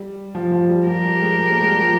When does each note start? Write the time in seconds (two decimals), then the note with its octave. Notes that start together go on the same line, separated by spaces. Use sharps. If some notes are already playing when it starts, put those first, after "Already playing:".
Already playing: G3
0.35 F3
0.52 F3
0.69 G3
0.86 F3 G4 A#4
1.04 G3
1.21 G#3
1.39 G3
1.51 A#3
1.61 G#3
1.71 G3
1.81 F3